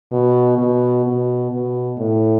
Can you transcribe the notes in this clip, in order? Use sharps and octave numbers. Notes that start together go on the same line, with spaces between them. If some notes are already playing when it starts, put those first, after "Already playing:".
B2
B2
B2
B2
A2